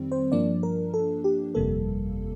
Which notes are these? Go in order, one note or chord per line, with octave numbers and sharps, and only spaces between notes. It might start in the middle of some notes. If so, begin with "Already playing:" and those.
Already playing: F2 D#3 G3 C4
C5
G2 F3 A#3 D4 D5
A#4
A4
G4
G1 F2 C3 G3 A#3 A4